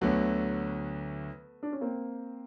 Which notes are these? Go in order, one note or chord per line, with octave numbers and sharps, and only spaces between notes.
D2 D3 F#3 A3 B3
D4
C#4
A#3 C4